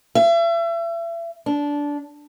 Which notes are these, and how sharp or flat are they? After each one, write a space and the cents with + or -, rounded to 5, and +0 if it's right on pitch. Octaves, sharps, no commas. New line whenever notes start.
E5 +35
D4 -15